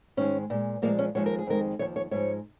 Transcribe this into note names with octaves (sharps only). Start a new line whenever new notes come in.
G#2 D#3 G#3 C#4
A#2 G#3
A#2 F3 G#3 A#3
C#4
D#2 C#3 F3 G#3 C#5
A#4
G#4
F2 D#3 G#3 A#4
D#2 C#3 F3 C#5
C#5
G#2 F3 G#3 C#5